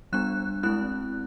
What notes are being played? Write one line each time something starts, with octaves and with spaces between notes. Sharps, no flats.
G3 B3 D4 F#6
G#3 C4 E4 F#6